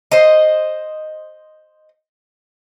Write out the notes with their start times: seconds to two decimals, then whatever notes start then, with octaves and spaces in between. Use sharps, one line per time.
0.12 C5 D#5